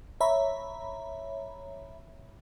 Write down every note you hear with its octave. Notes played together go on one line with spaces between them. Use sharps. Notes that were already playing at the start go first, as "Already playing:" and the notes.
C#5 E5 A#5 B5